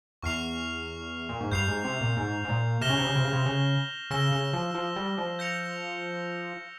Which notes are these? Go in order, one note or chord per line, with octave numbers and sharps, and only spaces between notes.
E2 C#6 F6 C7 F7
A#2
G#2
G2 G6 C7 F7
G#2
C3
A#2
G#2
G#2
A#2
C3 F6 A#6 E7 G7
C#3
C3
C#3
C3
C#3
C3
C#3
C#3 E6 A#6 E7 G7
C#3
F3
F3
G3
F3
G6 A#6 C#7 F7